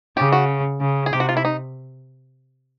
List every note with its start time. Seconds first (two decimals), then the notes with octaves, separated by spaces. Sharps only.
0.17 C#3 G4
0.32 F#4
0.80 C#3
1.06 G#4
1.13 C3 G4
1.20 F#4
1.29 F4
1.37 E4
1.45 D#4